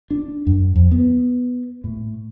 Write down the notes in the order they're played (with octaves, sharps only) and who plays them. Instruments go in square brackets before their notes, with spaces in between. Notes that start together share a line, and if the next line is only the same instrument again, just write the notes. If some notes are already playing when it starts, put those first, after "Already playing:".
[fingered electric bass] D4
F#2
F2
B3
A2